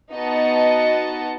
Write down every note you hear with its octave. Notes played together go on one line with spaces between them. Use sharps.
B3 D#4 F#4 D#5 A5 C#7